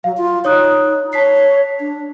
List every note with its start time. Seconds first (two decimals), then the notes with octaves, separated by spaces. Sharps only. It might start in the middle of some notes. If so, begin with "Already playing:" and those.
0.04 F#3 F5
0.17 F4
0.45 D#4 C#5 D#6 F#6
1.13 C#5 A5 B6 C7
1.80 D4